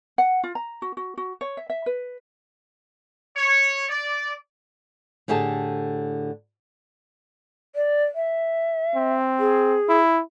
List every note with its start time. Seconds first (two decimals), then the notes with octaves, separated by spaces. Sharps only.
0.18 F#5
0.44 F4
0.55 A#5
0.82 F#4
0.97 F#4
1.17 F#4
1.41 C#5
1.57 E5
1.70 E5
1.86 B4
3.36 C#5
3.89 D5
5.28 A2 D3 G4 G#4 A5
7.75 D5
8.15 E5
8.95 C4
9.39 G#4
9.89 E4